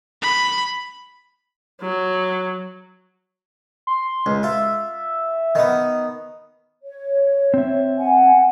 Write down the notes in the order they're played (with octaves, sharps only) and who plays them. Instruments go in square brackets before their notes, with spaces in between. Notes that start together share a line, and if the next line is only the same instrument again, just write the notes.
[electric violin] B5
[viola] F#3
[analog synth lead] C6
[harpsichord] C#2
[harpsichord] F4 [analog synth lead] E5
[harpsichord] D#3 B3
[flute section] C#5
[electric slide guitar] C4 E5
[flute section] F#5 G#5